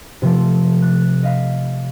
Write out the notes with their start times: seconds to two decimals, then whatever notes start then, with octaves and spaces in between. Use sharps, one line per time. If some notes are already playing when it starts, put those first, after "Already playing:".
0.22 C3 F3 A3
0.82 F#6
1.23 D#5 F5 B6